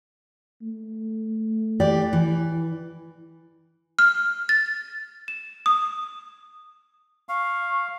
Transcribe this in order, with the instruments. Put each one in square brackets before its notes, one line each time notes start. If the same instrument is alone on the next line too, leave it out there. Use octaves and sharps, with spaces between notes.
[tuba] A3
[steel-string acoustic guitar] E3 G4 D5
E3
[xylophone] F6
A6
E7
D#6
[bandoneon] F5 [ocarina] C#6